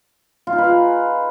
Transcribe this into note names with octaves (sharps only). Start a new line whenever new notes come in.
F4
D#4
B4
F5
G#4